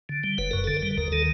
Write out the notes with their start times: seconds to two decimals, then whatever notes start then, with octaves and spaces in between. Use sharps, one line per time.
0.09 D3
0.24 G3
0.38 F#1 B4
0.51 F#2 A#4
0.64 D3 A4
0.77 A#4
0.82 G3
0.97 D#2 A#4
1.12 D#3 A4